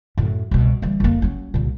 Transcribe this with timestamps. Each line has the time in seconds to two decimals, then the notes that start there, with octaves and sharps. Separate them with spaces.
0.17 F#2 A2
0.51 C2 B2
0.82 E3 G3
1.00 F2 A#3
1.22 F#3 C#4
1.54 C2 A#2